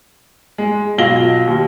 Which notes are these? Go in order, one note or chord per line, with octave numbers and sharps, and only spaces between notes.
G#3
B1 F4 A#6 G7
D#2